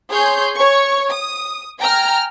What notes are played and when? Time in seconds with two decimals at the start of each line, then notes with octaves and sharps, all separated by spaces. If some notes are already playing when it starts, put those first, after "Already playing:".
0.11 G#4 C#5 C6 G6
0.55 C#5 C#6
1.12 D#6
1.79 G5 G#5 A#5 F6